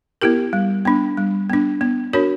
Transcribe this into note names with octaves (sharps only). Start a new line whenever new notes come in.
B3 E4 G4 A#4
G3
B3 D4
G3
B3 D4
B3
D4 F#4 A#4 C#5